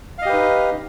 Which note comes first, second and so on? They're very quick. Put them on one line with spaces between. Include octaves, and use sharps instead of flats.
F5 D#5 G4 B4 D#4